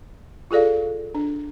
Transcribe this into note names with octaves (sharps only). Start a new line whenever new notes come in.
F4 G#4 A4 D5 F5
D4